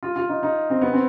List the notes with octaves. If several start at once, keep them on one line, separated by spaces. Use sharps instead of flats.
F4
F4
D#4
D#4
C4
B3
C4